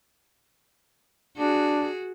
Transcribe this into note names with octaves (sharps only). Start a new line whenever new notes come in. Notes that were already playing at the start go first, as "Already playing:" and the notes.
D4 F#4 G#4